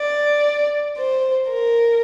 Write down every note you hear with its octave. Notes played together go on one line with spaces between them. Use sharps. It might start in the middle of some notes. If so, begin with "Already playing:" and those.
Already playing: D5
C5
A#4